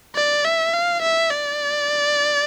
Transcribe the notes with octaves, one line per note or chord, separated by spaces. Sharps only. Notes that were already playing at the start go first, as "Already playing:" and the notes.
D5
E5
F5
E5
D5